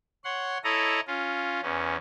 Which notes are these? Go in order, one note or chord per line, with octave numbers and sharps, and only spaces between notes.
C#5 F#5 C6
E4 A4 C#5 D#5 A#5
C#4 F4
E2 C#4